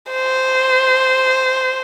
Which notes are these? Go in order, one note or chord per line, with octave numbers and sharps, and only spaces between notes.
C5